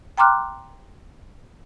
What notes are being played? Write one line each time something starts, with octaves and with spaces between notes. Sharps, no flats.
G5 A#5 C6 D6 F6 F#6